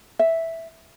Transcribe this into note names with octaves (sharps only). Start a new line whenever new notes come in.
E5